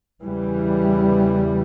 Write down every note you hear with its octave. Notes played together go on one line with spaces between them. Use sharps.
E2 C#3 E3 G3